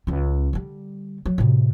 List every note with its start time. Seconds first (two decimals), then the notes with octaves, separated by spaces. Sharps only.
0.07 C#2 C#4
0.53 D3 G3
1.26 F#3
1.38 A2 C3